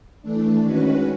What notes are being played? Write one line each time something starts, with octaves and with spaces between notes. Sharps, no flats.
E3 A3 D4
D#3 G#3 C#4 F#4 B4